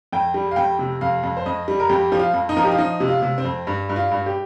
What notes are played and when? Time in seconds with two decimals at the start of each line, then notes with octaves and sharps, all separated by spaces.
0.13 F2 G5
0.34 G3
0.51 F5
0.56 F2 G5
0.79 C3
1.01 F2 F5
1.23 F2
1.37 C5
1.46 F2 D#5
1.68 G3
1.80 A#4
1.89 F2 G4
2.12 F3 G4
2.19 F4
2.34 F2
2.49 D#4
2.57 F3 A#4
2.64 G4
2.72 F4
2.78 F3 D#4
3.00 C3
3.08 F4
3.22 C3
3.38 C4
3.45 F2
3.67 G2
3.89 G2
3.96 F4
4.11 G2
4.26 G4